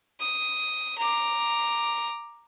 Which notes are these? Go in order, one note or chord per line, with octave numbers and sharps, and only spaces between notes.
D#6
A#5 D6